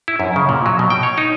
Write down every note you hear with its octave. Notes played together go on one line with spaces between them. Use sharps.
E4
F#2
C#3
A#2
F#3
B2
G5
C#5
D#4